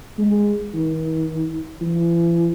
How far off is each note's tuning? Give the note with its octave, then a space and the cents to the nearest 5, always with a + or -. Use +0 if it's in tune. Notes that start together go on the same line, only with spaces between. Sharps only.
G#3 -10
D#3 +45
E3 +45